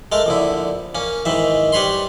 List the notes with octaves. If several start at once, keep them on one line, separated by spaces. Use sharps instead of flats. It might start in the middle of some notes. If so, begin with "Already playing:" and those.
G#3 A3 A#4
A#1 D3 E4
A#3 C#4
G#2 D#3 E3 E5
G3 B4 C#5 B5 C6